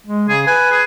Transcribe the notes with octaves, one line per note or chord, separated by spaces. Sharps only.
G#3
C#3 G#4
B4 G#5
G#4